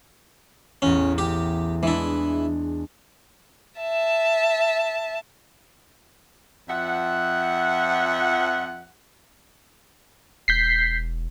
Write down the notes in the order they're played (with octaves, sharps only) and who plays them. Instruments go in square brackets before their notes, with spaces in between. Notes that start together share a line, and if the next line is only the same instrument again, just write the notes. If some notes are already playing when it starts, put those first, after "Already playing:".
[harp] A1 E2 [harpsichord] C#4
[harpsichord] G4
[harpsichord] E3 E4 [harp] G#3 D4
[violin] E5 A5
[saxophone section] F2 F3 E5 F#5
[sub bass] E1 [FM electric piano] G6 B6 C7